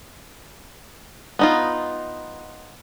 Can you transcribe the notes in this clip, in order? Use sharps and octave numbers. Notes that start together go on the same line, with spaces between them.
B3 D#4 F4